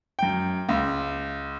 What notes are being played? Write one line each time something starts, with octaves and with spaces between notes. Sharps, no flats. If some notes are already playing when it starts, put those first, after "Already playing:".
F#2 G5
C#2